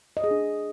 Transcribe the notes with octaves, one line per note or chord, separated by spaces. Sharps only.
D#5
G#4
D4